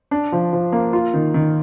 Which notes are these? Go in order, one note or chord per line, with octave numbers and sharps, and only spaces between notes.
D4
F3
F3
A#3
F4
D#3
D#3